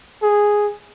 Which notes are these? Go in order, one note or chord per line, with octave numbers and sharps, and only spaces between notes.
G#4